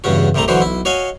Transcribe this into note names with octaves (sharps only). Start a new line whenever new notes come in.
E2 G2 C#3 C#4 F#4
C2 C3 G3 A3 A#5
D3 E3 F#3 F#4 C5
B1 E4
F#4 C#5 D#5 F5 G#5